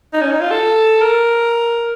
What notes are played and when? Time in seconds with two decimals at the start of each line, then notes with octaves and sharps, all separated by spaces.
0.13 D#4
0.22 C#4
0.31 D#4
0.41 F4
0.51 A4
1.01 A#4